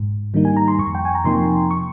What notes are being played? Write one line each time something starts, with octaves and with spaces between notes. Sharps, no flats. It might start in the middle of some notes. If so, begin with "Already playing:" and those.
Already playing: G#2
D#3 G3 A#3 D#4
G#5
A#5
C6
F2 C#6
G5
G#5
A#5
C3 F3 A#3 D#4 C6
C#6